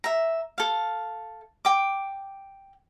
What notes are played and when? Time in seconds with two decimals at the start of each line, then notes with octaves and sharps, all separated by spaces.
0.04 E5 A#5
0.58 A4 F5
1.65 G5 D6